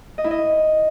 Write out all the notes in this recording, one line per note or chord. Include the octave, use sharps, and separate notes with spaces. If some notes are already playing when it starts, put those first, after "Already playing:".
D#5
E4
D#5